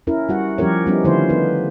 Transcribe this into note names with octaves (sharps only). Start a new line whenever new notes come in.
C#4 E4 A#4
G3 F#4 F#5
F3 G3 C#4 G4 A#4 C#5
G3 B3 C#4 D#4 E4
D3 D#3 F3 A3 E4 C5
B3 D#4 B4